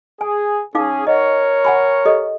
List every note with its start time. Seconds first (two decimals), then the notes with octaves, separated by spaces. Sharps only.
0.21 G#4 G#5
0.75 C#4 D#4 G#4 F5 D6
1.07 A#4 C#5 D#5 F#5
1.65 F#5 G#5 B5
2.05 G4 A4 D#5